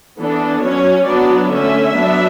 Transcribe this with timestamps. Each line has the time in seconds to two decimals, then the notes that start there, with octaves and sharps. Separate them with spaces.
0.17 E3 B3 D4 A4
0.62 F#3 C#4 C#5
1.06 F#3 B3 D4 D5
1.51 D3 A3 C#4 E5
1.95 F#3 B3 D4